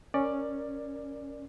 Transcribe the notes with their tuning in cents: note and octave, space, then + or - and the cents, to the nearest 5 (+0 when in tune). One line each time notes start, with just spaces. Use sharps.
C#4 +0 A#4 +0 D5 +10